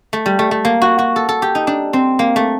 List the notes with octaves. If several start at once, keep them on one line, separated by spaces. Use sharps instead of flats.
A3
G3
A3
A3
A#3
F#4
F#4
A4
A4
G4
D#4
D4
C4
A#3
A3